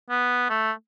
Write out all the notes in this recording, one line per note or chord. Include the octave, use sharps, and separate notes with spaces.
B3
A3